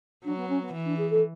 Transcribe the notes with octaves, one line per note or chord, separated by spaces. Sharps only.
F#3 D4
B3
C#4
B3
E3
D4
G#4
A4